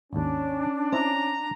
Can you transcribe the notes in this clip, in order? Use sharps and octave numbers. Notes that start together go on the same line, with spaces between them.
G#1 D#2 C#4 D4
C4 D#4 E4 A#5